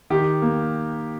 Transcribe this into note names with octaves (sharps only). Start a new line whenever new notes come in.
D#3 G4
A#3